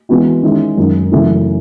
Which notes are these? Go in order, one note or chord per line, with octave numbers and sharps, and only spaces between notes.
E3 G#3 B3 F#4
D#3 G#3 C#4 E4
F#2 D#3 G#3 D#4
F#2 C#3 E3 A3 E4